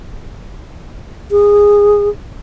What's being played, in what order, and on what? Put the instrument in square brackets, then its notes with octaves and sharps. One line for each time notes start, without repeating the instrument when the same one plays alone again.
[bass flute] G#4